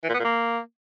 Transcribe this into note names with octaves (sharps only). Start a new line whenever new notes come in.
E3
A#2
B3
A#2
A#3